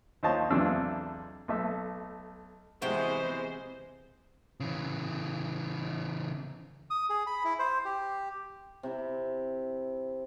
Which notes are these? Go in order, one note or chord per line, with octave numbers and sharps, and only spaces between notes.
D#2 F4 C5 C#5 D#5 A5
B1 E2 C3 D4 F4 E6
B1 A3 E5
C3 E3 G#3 B3 F#4 C5 G5
C#3 E3
D#6
G#4
B5
E4
C5
G4
C3 E4